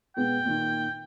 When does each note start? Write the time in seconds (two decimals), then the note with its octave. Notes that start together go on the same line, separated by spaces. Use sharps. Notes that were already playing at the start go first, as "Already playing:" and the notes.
0.17 B2 G#3 B3 G5
0.45 A#2 D#3